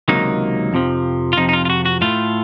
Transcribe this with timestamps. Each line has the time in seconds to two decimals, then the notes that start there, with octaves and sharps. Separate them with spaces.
0.08 C#2 C3 D#3 F#3 A#3 D#4
0.73 F2 C3 F3
1.33 F4
1.37 F2 C3 F3 D#4
1.49 D#4
1.53 F4
1.65 F4
1.70 F#4
1.85 F#4
2.01 A2 A3 F4